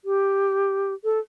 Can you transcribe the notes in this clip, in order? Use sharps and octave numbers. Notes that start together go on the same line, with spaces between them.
G4
A4